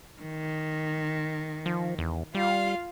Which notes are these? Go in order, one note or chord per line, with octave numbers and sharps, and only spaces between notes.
D#3
F3
E2
G3 F4 F5